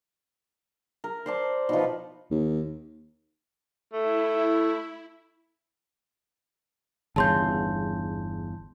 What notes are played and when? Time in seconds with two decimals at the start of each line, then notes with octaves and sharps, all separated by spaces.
1.04 A#4
1.26 C5 D5 A5
1.69 B2 F3 D#4 B4 D5
2.31 D#2
3.93 A3 E4
7.16 G1 E2 C#3 A5 C6 G6